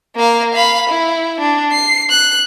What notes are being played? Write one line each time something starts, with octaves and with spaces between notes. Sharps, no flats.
A#3 F5
F5 B5
E4
D4
C7
F#6